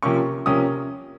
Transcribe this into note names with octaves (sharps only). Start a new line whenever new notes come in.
C3 F3 A#3 C#4 C#6
C3 F3 A#3 C#4 D#6